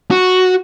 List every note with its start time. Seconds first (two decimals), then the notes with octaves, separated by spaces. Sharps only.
0.11 F#4